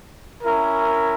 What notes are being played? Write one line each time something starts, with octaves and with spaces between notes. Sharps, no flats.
C#4 E4 A#4